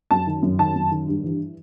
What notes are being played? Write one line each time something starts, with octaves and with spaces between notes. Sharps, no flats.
F#2 A5
D#3
F#2
D#3 A5
F#2
D#3
G2
E3